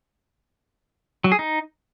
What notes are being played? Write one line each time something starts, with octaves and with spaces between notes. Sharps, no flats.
F#3
G#4
D#4